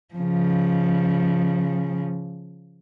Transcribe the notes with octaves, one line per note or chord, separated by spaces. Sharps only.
C#3 F3